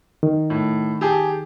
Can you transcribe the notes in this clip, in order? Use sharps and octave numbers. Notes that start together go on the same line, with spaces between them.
D#3
A2
G4 G#4 A5